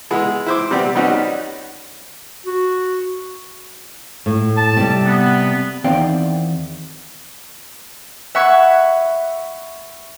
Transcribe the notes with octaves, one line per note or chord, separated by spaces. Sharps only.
G#3 B3 E4
E4 C5 D6
C3 G3 B3 C4
G3 B3 C#4 D#4 F#4
F#4
A2
A5
C3 G3
B3
E2 D#3 C4 D5 F5 G5
E5 F#5 B5 C#6 G#6